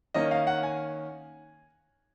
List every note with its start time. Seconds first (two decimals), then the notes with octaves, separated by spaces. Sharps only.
0.14 D#3 A#3 C#4 D#5
0.31 F5
0.47 F#5
0.63 G#5